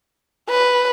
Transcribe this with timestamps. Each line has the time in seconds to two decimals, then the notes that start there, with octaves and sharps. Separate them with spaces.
0.50 B4